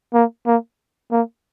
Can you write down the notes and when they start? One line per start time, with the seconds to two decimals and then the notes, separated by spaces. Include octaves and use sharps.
0.14 A#3
0.47 A#3
1.12 A#3